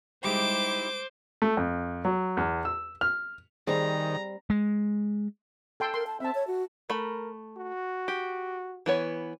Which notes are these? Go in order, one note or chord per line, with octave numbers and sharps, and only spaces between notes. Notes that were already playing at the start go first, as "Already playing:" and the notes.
G3 G#3 D#4 E4 G4 C5 D6
A3
F2
F#3
E2
E6
F6
D#3 G3 C4 G#4 C5 A#5
G#3
A4 G5 C6
A#4 C6
A5
C4 E5 A5
C#5
F#4
A3 A#4 B5
F#4
G4
E3 B3 C#5